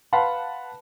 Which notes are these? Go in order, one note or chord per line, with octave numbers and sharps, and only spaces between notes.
B4 F5 F#5 A5 B5 C6